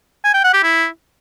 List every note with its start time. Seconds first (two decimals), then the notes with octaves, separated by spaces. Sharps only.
0.25 G#5
0.34 G5
0.44 F#5
0.54 G4
0.63 E4